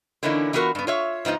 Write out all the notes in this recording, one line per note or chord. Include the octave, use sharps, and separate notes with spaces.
D3 E3 A#3 C#4 D#4 E4
E3 B3 F4 F#4 A#4
G2 B3
F4 C#5 E5
G#2 F3 B3 D#4